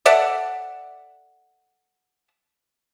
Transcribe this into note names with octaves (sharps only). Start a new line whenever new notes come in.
A4 D5 E5 F#5